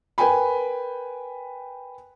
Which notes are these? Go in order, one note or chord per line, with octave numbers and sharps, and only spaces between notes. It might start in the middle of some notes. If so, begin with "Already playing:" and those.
A#4 B4 G5 G#5 B5